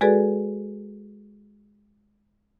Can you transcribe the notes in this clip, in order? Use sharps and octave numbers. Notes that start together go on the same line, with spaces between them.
G#3 F#4 G#4 A4 B4 D5